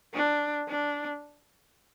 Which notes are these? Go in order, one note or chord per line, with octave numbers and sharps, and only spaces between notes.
D4
D4